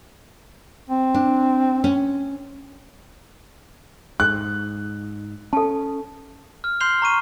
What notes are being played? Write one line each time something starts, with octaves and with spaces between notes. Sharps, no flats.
C4
D4
C#4
G#2 F#6
C#4 A4 A5
F6
C6 F6 G6 C7 F7 G7
A#5 C#6 D#7